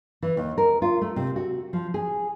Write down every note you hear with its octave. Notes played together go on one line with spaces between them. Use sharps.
E3
D#2
A#4
F4
A3
C3
F#4
F3
G#4